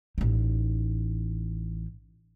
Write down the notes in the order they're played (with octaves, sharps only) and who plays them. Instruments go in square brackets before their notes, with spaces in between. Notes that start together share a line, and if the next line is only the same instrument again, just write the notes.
[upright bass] A1 D#4